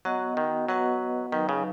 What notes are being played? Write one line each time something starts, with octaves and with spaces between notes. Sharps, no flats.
F#3 B3 F#4 D#5 F#5
D#3
F#3 B3 F#4 B4 D#5 F#5
D#3 F#3 D#4 B4
C#3